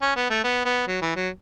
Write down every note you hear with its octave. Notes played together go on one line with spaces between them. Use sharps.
C#4
B3
A3
B3
B3
F#3
E3
F#3